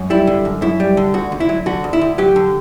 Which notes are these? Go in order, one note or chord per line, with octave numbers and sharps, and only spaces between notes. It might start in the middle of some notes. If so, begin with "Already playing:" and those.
Already playing: F#2
G3 E4
D3
F#2
F#2 E4
G3
D3
D2 F#4
D2
E4
F#3
D3 F#4
D2
E4
D2
F#3 G4
D3